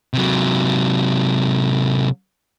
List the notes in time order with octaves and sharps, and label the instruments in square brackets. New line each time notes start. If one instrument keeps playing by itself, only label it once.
[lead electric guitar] C3 F#3